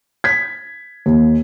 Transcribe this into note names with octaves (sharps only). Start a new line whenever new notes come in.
G#6 B6
D#2